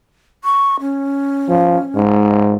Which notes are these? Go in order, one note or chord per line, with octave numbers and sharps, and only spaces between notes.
C#6
C#4
F3
G#2